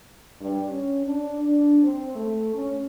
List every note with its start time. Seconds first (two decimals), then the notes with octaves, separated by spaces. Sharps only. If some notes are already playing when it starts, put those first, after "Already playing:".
0.41 G2
0.69 C#4
1.05 D4
1.39 D4
1.82 C4
2.15 A3
2.54 C#4